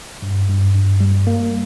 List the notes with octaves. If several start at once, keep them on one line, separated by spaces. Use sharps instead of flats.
G2
G2
G2
G3
A#3